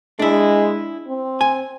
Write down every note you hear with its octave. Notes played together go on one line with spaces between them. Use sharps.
G#3 D4 E4
C4
G#5